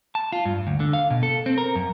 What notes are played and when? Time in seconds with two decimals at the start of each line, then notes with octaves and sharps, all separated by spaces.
0.15 A5
0.32 F4
0.46 G2
0.67 D2
0.80 D3
0.93 F5
1.10 B2
1.23 A4
1.46 C4
1.58 A#4
1.76 F#2